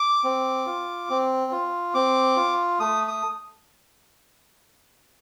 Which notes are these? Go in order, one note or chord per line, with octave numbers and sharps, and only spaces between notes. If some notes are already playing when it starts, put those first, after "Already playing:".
Already playing: D6
C4
F4
C4
F4
C4 D6
F4
A3 D#6
D#6